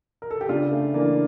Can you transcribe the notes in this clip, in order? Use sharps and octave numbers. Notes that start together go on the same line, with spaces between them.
A#4
A4
G4
C#3 D4 F4
A3
E3 A#3 D4